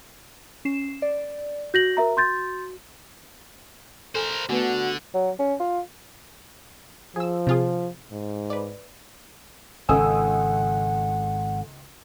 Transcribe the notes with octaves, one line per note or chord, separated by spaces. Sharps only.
C#4 C7 E7
D5
F#4 G6 A#6 F#7
A#4 E5 A#5
C6 G6 A6
A4 A#4 C5 G#5
D3 A3 B3 F#4 B4
F#3
C#4
F4
F3 G#4 E6
C3 F4 G#4
G#2
B4 D5
G#1 C#2 A4 F#5 G#5 D#6 E6